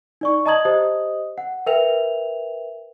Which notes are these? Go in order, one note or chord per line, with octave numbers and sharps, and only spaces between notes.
D#4 D5 C#6
D#5 A5 A#5 D#6 G#6 F#7
G4 C5 D#5 D#6
F#5
A#4 B4 E5 G5 F7